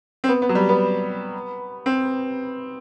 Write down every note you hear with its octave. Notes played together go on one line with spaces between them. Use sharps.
C4
B3
B3
F#3
G3
B3
C4